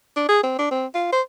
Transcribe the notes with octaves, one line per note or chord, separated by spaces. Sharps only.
D4
G#4
C4
D4
C4
F4
C5